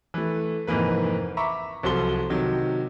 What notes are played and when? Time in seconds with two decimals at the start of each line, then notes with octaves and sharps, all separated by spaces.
0.14 E3 A3
0.67 F1 G#2 E3 A#3 B4
1.37 E5 A#5 B5 C#6 D6
1.83 C2 F3 F#3 A4 C6 G7
2.30 C3 D#3 F#3